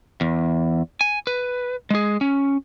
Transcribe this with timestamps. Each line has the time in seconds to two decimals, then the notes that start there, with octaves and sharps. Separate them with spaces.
0.21 E2
1.01 G#5
1.27 B4
1.90 G#3 G#4
2.21 C#4